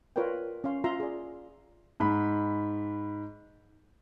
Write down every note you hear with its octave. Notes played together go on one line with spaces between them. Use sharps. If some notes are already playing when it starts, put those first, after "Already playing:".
F4 A#4 B4 C#5 D5 G5
C#4 C#5 F5 C6
F4 E5 A#5 C6
G#4 D5
G#2 B5